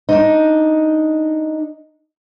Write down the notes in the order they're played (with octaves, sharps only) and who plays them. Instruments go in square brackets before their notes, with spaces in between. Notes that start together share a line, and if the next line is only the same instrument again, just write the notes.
[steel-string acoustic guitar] D4 D#4